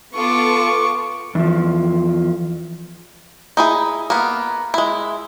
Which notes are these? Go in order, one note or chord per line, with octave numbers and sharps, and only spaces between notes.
B3 F4 A4 C#6 D6
E2 F3
D#4 E4 G#4
A#3 B3
G#3 E4